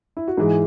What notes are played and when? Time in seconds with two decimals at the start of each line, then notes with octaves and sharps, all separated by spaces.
0.17 E4
0.28 F#4
0.37 G#2 E3 G#3 G#4